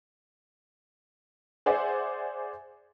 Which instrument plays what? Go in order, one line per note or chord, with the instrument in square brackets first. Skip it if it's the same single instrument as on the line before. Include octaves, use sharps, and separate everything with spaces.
[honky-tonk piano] G#4 C5 D5 E5 F#5 G#5